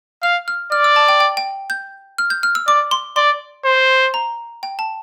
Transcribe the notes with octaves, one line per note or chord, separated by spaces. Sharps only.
F5 F6
F6
D5 F6
E6
A5
G5
G5
G5
G6
F6
G6
F6
E6
D5 D6
C6
D5 C6
C5
A#5
G5
A5